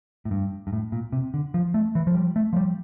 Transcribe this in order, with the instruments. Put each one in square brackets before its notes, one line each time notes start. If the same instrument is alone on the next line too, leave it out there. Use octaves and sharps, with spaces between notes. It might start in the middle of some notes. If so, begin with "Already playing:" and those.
[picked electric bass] A2
G2
G2
A2
A#2
C3
D3
F3
A3
E3
F3
G3
A3
F3
G3